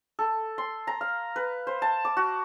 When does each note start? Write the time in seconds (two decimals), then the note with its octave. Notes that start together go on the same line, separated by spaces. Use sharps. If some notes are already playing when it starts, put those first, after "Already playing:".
0.19 A4
0.58 C6
0.87 A#5
1.01 F5
1.36 B4
1.67 C5
1.82 A5
2.05 D6
2.17 F#4